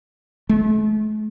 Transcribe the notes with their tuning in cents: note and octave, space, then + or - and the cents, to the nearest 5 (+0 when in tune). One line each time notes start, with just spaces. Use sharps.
A3 -45